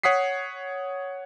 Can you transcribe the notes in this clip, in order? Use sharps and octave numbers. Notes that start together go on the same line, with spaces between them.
C#5 F#5 D#6 B6 C7